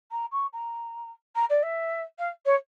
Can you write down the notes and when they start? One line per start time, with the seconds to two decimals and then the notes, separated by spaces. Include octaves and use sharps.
0.11 A#5
0.32 C#6
0.53 A#5
1.35 A#5
1.50 D5
1.63 E5
2.18 F5
2.45 C#5